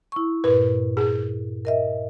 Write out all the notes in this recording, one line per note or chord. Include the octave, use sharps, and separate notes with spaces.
E4 C#6
G2 A#2 B4
G#4
A#4 D#5 E5